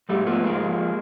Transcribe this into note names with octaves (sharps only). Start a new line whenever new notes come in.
G#2 G3 A3
F3 A3 B3
G#2 G#3 A#3
F3